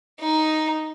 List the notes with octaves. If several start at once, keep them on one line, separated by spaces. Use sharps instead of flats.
D#4